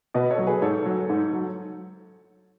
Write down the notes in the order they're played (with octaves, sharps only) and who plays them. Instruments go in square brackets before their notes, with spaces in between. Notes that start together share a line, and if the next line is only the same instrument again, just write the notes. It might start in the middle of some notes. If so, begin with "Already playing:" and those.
[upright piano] B2 B4 D#5
A4 C#5
F#3
G#4 B4
G#2 A4 C#5
F#3
G#2
F#3